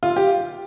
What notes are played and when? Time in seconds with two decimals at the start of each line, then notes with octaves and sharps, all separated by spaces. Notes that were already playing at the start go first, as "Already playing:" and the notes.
0.03 F4
0.16 G4